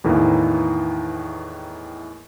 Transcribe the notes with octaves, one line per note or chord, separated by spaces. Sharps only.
E2 A2 D#3 E3 A#3